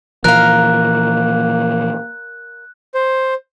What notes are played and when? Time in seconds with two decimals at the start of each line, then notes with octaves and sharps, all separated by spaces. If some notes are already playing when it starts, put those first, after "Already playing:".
0.24 A#2 E3 F3 A#3 A#4 F5 F#6
2.94 C5